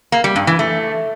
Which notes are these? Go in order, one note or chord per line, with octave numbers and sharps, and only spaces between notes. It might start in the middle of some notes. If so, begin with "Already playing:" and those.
A#3
G3
G2
E3
A3